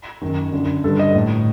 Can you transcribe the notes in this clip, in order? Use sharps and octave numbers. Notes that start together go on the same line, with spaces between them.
F#2 D#3
F#2 D3
G2 D3 A4
D#5
A2